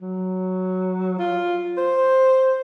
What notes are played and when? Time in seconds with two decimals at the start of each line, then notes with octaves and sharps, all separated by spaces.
0.02 F#3
1.19 F4
1.78 C5